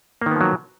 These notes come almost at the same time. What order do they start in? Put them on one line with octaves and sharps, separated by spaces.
A#3 D#3 B3 F3 F#3